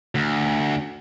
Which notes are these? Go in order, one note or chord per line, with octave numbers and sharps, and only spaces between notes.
D2